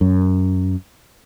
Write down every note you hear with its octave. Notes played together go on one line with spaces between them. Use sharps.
F#2